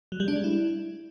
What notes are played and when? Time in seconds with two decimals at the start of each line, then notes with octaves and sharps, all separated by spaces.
0.12 F#3
0.20 G3
0.28 D4
0.36 G#3
0.44 E4